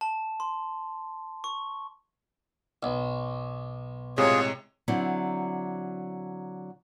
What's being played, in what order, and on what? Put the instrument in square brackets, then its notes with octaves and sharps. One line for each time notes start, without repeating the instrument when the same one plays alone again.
[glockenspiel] A5
C6
C#6
[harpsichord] B1
[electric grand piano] A2 C3 G#3 [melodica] F4 G#4 [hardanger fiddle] C#5
[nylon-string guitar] D3 F#3 C4 E4